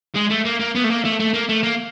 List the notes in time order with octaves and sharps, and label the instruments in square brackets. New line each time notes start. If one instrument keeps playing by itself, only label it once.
[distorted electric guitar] G#3
A3
A#3
A#3
B3
A3
A#3
A3
A3
A#3
A3
A#3